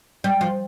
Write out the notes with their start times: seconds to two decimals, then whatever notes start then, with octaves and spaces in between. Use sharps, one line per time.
0.24 G3
0.41 F3